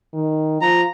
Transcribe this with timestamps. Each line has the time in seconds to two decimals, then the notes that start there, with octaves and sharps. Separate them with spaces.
0.13 D#3
0.61 F3 A#5